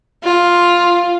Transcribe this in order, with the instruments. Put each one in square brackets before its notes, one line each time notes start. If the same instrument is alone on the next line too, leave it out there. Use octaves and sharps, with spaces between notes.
[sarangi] F4